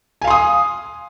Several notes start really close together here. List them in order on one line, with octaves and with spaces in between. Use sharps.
G#5 F5 C6 D#6